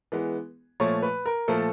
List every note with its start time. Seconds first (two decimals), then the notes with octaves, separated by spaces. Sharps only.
0.12 E3 G#3 B3
0.80 A#2 F3 A3 C#5
1.02 B4
1.26 A#4
1.48 A#2 F3 A3 A4